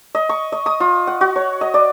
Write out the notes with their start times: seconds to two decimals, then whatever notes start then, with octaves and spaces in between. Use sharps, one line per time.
0.15 D#5
0.29 C#6
0.52 D#5
0.66 D#6
0.80 F4
1.07 F#5
1.21 F#4
1.36 C#5
1.61 D#5
1.74 D5